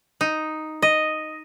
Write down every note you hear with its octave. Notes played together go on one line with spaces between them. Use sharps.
D#4
D#5